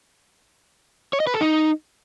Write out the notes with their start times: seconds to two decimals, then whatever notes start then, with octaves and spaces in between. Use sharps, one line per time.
1.13 C#5
1.20 D#5
1.27 B4
1.34 A4
1.41 D#4